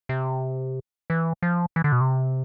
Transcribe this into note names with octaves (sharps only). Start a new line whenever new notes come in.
C3
E3
F3
E3
D3
B2
C3